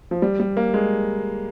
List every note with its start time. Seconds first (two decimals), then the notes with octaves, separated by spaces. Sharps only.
0.11 F3
0.22 G3
0.40 G3
0.57 A#3
0.74 G#3